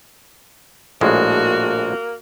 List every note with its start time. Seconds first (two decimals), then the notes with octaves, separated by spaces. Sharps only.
1.01 A#1 A2 G#3 A#3 F#4